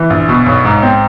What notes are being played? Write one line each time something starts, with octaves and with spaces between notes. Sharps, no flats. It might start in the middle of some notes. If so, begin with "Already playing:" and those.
Already playing: E3
A#1
B2
B1
G#2
C4